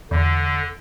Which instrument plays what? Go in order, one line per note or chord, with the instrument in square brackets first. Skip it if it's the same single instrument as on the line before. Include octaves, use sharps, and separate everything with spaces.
[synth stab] E2 [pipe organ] D3